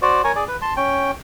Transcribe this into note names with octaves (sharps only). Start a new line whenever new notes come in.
F#4 C5 D5
A#4 C#5 G#5
G#4 D5
B4
A5 C6
C#4 G5